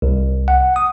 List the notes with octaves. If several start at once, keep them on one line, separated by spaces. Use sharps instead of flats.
C2
F#5
D#6